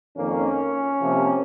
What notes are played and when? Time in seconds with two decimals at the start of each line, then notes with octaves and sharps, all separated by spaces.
0.16 F2 D#3 A#3 C#4
1.00 C3 F3 A#3